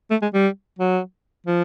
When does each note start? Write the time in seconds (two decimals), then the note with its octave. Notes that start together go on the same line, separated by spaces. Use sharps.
0.11 A3
0.22 G#3
0.34 G3
0.79 F#3
1.47 F3